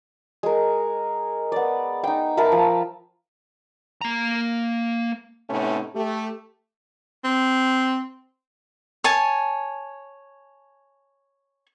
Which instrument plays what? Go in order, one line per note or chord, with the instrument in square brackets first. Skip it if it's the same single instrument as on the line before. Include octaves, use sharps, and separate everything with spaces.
[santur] G#3 A#4
B3 D5
D#4 G5
A#4 E5 A5 B5
F3
[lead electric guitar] A#3 A#5
[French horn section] A2 C3 A3 B3 C#4 D#4
A3 G4
[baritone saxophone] C4
[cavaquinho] C#5 G#5 A5